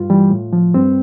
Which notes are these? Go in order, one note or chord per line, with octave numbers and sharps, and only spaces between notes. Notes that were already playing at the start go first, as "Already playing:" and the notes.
Already playing: G2 F4
E3 G3
A2
F3
G2 C4